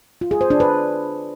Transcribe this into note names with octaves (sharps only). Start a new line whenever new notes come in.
F4
G#4
C5
D4
B4